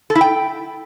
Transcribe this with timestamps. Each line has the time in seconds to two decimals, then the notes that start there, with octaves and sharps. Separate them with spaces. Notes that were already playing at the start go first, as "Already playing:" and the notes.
0.10 A4
0.15 E4
0.21 G5